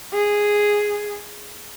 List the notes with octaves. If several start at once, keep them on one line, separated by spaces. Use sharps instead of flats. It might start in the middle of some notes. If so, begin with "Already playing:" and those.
G#4